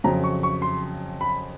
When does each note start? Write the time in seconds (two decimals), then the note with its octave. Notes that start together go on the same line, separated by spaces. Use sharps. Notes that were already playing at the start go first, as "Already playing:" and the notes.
0.04 F2 C#3 F#3 A#5
0.24 C#6
0.43 C#6
0.62 C6
1.21 B5